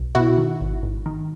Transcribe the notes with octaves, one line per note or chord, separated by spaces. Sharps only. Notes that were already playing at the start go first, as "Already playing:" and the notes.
Already playing: B1
B2 E4 F#4
D#3
G#1
G#1
D#3